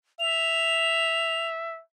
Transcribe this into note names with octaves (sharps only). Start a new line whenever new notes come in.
E5 F7